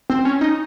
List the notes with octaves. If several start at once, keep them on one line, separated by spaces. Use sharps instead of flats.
C4
C#4
D#4